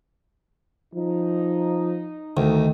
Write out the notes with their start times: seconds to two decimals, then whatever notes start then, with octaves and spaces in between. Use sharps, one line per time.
0.95 F3 D#4
2.37 D2 D#3